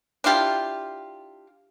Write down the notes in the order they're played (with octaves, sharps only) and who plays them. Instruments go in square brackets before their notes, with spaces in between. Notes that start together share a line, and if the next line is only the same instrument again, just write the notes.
[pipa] D4 E4 F4 G4